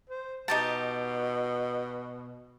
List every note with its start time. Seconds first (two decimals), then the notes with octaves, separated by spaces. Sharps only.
0.10 C5
0.48 B2 D#4 G4 A5